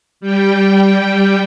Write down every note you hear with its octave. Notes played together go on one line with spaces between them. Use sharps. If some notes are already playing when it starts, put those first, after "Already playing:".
G3 G5